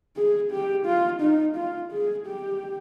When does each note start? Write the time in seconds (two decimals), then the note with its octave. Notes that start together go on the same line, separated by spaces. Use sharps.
0.16 G#4
0.51 G4
0.86 F4
1.21 D#4
1.56 F4
1.92 G#4
2.26 G4